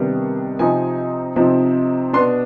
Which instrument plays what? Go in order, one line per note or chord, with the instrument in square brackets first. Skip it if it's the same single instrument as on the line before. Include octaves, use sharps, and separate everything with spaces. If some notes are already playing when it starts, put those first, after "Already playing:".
Already playing: [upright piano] C3 D#3 G3 B3 D4
C3 F3 C4 D#4 G#5
C3 F3 C4 D#4
B2 B3 D4 C6